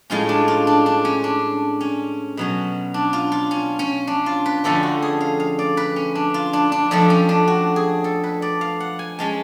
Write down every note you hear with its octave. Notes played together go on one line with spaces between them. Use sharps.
A2 G#3 C#4 F4
D4
F4
D4
D4
C#4
D4
C#4
B2 F#3 C#4
D4
F4
F4
C#4
C#4
D4
F4
B4
F2 D3 F3 A3 C#4 A4
F#4
G#4
F5
F5
D5
B4
C#4
D4
F4
D4
D4
F2 F3 A3 D4
C#4
D4
F#4
G#4
A4
B4
D5
F5
F#5
G#5
G#3 C#4 A5